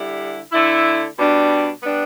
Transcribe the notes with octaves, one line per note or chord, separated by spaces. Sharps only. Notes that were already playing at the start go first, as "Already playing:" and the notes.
Already playing: D3 G3 E4
D3 A3 E4
B2 G3 D4
G3 B3 D4